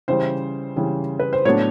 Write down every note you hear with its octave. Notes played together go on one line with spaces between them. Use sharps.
C#3 E3 G3 C5
C#3 E3 G3
B4
C5
A2 F#3 B3 D4 C#5